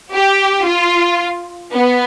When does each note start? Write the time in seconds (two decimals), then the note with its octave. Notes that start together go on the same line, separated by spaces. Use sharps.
0.11 G4
0.65 F4
1.73 B3